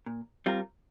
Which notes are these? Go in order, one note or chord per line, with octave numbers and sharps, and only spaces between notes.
A#2
G3 C4 F4 A#4